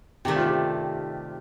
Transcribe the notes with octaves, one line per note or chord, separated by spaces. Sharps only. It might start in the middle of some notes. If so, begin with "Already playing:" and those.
C3 D#3 A3 D4 G4
F4
G4